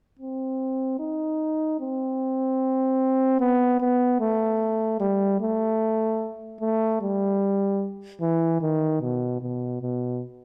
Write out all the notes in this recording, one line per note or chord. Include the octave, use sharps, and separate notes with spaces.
C4
D#4
C4
B3
B3
A3
G3
A3
A3
G3
E3
D#3
B2
B2
B2